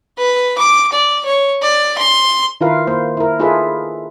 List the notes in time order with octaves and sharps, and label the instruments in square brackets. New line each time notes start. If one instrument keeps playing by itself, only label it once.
[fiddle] B4
D6
D5
C#5
D5
C6
[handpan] D#3 E4 F4 A#4 B4 F5
A#3 C5
E4 A#4
D#4 F4 G#4 A4 B4 E5